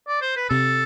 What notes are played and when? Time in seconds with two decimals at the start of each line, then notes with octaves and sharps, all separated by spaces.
0.08 D5
0.22 C5
0.36 B4
0.49 C3 A4